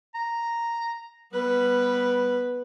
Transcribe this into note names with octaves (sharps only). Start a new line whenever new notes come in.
A#5
G3 B3 B4